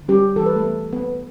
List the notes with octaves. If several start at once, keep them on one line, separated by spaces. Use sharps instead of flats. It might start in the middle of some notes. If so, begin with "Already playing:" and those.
Already playing: D3
G3 C#4 G4
E3 A4
B4
A3 A4
B3
B3 B4